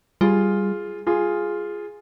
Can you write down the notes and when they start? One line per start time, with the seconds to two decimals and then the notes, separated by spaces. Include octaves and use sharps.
0.21 G3 F4 G#4
1.07 F4 G#4